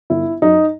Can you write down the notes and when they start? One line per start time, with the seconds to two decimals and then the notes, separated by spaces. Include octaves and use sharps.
0.10 G1 E4
0.42 F#2 F#3 D#4